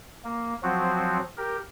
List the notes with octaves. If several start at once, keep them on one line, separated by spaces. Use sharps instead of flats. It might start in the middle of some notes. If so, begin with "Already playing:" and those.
A#3
F3 F#3 C4 F#4
G4 A#4